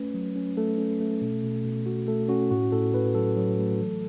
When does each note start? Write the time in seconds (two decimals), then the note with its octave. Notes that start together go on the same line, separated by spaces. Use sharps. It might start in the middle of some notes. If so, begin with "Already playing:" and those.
Already playing: A3 C#4 B4
0.14 F#3
0.36 C#4
0.57 A3 A4
0.78 C#4
1.00 A3
1.22 B2
1.43 B2
1.65 B2
1.86 B2 F#4
2.08 A3 A4
2.29 C#4 F#4
2.51 A2 F#4
2.72 A2 A4
2.93 A2 B4
3.15 F#3 A4
3.37 F#3
3.58 A3
3.80 E3